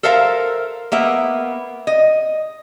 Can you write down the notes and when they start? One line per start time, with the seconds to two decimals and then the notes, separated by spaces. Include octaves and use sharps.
0.03 A4 A#4 C5 E5 F5 A#5
0.92 A#3 B3 E5
1.87 D#5